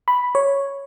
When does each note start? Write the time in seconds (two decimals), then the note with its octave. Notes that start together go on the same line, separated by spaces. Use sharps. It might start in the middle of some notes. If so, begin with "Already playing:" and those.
0.08 B5
0.35 C#5